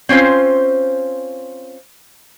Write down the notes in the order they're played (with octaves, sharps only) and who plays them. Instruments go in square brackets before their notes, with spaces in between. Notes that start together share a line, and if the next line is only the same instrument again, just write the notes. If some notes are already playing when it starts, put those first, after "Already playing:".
[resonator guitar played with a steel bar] C4 C#4 F4 C5